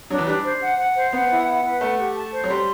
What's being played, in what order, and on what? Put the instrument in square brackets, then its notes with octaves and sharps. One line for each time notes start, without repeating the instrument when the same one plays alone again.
[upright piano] F#3 [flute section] D4
[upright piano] E3
[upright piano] G3 [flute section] D4
[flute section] C5
F#5
F#5
C5
[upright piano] B3 [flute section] F#5
[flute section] E4
F#5
B4
[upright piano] A3 [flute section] F#5
[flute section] G4
A5
C5
[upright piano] F#3
[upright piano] G3 [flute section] C6